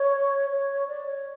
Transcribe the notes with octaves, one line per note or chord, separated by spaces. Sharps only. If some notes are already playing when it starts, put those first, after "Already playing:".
Already playing: C#5
C#5
D5
C#5